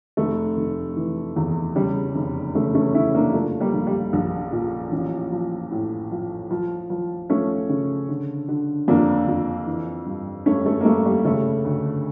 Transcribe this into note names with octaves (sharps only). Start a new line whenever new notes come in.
F1 A3
F1
E3
E2
C#3 G3
F1
C#3 A3
A3 C#4
F1 C#4 E4
A#3 D4
F3 A3
G3 A#3
A#1
G3
A#1
A#2
A1
F3
A2
F3
F3
F3
F3 A3 C#4
C#3
D3
D3
F2 A#3 D4
F2
E3
G2
G2 A3 C#4
A3
A#3
G2 A3
G3
C#3 A3
D2